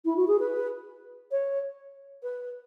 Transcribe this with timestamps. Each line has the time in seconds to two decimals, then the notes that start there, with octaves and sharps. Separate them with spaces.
0.05 E4
0.16 F#4
0.27 G#4
0.39 B4
1.31 C#5
2.22 B4